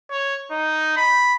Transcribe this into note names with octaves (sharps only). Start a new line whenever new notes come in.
C#5
D#4
B5